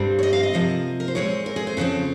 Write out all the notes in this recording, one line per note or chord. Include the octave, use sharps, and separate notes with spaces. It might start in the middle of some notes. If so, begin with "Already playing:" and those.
Already playing: G2 G3 C4
C#5
D#5
F5
D#5
C3 F3 A#3
A#4
C5
A#2 G#3 C4 C#5
A#4
G#4
C5
F2 C#3 F3 C4 C#5